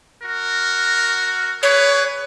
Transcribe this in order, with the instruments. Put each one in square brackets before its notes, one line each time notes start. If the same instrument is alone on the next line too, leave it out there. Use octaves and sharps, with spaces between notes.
[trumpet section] F#4 A#4
[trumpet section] G#4 B4 [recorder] C#5